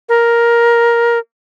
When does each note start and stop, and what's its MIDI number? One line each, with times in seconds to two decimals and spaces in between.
0.09 1.18 70